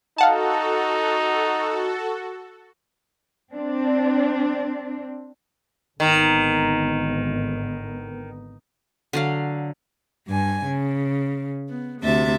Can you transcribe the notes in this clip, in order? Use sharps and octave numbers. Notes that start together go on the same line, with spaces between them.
D#4 F#4 A4 F5 F#5 A5
C4 D4
G#1 D3 D#3 B3
D3 F#3 F5
G2 G#5
C#3
B3
D2 C3 E5 A6